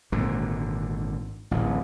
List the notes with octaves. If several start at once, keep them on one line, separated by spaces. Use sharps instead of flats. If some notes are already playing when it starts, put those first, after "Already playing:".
G#1 A#2 D3
D1 A1